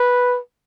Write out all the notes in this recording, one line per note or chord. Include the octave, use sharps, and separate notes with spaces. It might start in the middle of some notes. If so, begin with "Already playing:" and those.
Already playing: B4